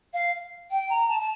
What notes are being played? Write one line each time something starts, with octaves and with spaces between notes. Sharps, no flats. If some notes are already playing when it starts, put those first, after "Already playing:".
F5
G5
A#5
A5
A5